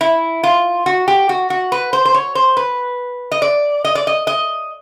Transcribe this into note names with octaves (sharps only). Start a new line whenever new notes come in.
E4
F4
F#4
G4
F#4
F#4
B4
C5
C5
C#5
C5
B4
D#5
D5
D#5
D5
D#5
D#5